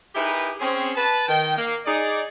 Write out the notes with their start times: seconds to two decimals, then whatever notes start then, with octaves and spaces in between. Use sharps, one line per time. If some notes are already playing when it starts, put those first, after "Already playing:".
0.15 D#4 E4 G4 G#4 A#4 B4
0.60 C4 C#4 G#4
0.95 B4 A5
1.28 D#3 G5
1.56 A#3
1.86 D#4 G#4 D5